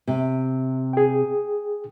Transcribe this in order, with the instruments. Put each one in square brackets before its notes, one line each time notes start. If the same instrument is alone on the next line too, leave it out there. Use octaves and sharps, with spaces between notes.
[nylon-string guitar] C3
[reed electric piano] G#4 G5